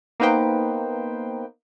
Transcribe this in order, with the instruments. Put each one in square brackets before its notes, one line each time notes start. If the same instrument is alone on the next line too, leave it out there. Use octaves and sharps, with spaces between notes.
[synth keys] A#3 B3 D#4 B4 C5 G5